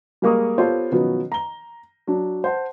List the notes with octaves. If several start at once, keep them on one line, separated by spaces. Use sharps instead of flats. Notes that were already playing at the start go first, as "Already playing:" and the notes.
G3 G#3 A#3 A#4 C#6 D#6
B3 F4 G4 A4 C5 C#5
B2 D#3 F3 F#3 B3 C#4
A#5 G7
F#3 D4
C5 F#5 A5